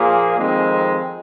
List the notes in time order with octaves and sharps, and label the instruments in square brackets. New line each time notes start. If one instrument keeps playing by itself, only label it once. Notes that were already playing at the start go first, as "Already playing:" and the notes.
Already playing: [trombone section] A#2 F3 A#3 F4 G#4
F2 D#3 G#3 C4